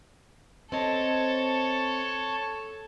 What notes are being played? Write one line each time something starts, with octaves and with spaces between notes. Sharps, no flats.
C4 A4 C#5 D#5 A5